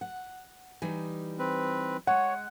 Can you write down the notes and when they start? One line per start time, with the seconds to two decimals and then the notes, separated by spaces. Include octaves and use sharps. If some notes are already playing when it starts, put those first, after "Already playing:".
0.01 F#5
0.82 E3 G3 D#4
1.39 C4 B4
2.07 G#3 C#5 F#5